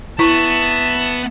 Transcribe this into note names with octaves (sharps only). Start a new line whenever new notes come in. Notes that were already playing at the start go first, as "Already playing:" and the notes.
B3 E4 E5 A5 A#5 C#6 B6